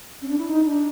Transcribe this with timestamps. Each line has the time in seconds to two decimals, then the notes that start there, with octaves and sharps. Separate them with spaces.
0.22 C#4
0.28 D4
0.38 E4
0.47 D#4
0.65 D4